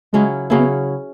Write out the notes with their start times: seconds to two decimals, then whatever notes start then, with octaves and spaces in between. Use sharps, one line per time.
0.13 C#3 F#3 G#3 C#4 E4
0.50 C#3 F#3 A#3 C#4 E4
0.59 B3